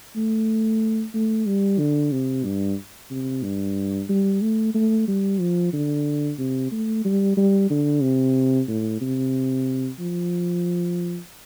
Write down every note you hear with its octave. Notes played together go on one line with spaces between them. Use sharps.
A3
A3
G3
D3
C3
G2
C3
G2
G3
A3
A3
G3
F3
D3
C3
A3
G3
G3
D3
C3
A2
C3
F3